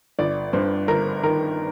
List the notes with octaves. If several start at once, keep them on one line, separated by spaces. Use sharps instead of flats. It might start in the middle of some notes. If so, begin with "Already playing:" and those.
G1 D5
G2 C5
G1 A#4
D#3 A#4